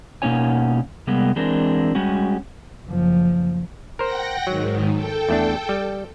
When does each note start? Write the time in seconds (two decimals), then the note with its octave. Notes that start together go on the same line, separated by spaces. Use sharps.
0.22 B2 A#3 C#4 D#4 C#5 G#5
1.07 C3 G3 G#3 A#3 B3
1.36 E3 G#3 C4 D4 A#4
1.95 G3 G#3 C#4 F#4
2.87 F#1 F3
3.99 A#4 C5 F#5 G5 A#6
4.47 G#2 D#3 F#3
4.93 A4 G5
5.29 E2 A3 D4
5.69 G3